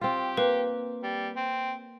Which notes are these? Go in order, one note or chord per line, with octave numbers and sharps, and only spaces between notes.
C4 F4 G4
A#3 B4
G3
C4